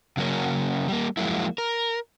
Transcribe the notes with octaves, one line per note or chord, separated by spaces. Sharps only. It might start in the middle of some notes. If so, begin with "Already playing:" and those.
C#3 F#3 A#3 C#4
G3 A#3
F3 F#3 G#3 A#3 E4
A#4